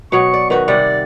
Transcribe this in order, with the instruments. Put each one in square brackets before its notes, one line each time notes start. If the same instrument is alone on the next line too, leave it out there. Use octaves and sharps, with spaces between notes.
[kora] B2 F#3 [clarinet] C#6
[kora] D5
[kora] D#3 F#4 [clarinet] B4
[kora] C3 G3 F#5 [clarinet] D5